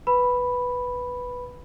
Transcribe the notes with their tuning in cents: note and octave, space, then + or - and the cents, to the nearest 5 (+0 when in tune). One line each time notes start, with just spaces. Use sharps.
B4 +0 B5 +0